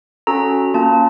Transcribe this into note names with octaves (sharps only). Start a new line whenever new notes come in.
C#4 F#4 A4 A#5
A#3 C#4 F4 A5